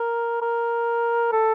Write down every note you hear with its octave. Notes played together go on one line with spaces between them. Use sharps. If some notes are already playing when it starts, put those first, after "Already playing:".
Already playing: A#4
A#4
A4